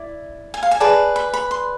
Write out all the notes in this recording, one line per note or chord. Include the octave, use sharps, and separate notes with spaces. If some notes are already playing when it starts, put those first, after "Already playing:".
Already playing: E4 D5
G#5
F5
G#5
G#4 B4 D5 A5
B5
B5
C6